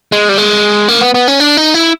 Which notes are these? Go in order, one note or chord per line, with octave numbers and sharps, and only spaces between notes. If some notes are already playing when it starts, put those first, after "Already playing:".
G#3
G3
G#3
A#3
B3
B3
C#4
D4
D#4
E4